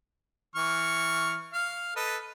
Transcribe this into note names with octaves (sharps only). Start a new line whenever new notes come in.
E3 C#6 F6
F5 F6
A4 B4 D#5